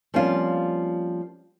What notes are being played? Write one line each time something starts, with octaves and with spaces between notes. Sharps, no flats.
F3 G3 A#3 C4 C#4 F4